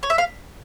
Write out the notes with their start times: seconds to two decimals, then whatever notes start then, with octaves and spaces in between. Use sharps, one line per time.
0.03 C#5
0.10 E5
0.18 F5